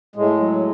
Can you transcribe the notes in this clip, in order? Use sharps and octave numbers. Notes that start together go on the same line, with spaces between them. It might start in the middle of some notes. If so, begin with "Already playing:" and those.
A2 G#3
F#3